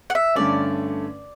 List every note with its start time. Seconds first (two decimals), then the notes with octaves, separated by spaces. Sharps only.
0.10 F#5
0.15 E5
0.36 G2 D3 A3 C#4 D5